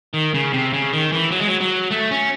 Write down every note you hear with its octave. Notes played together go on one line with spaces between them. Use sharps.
D#3
C#3
C3
C#3
D#3
E3
F#3
G#3
F#3
F#3
A3
C#4